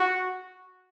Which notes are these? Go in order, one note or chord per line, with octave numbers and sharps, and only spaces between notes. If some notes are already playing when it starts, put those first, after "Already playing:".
Already playing: F#4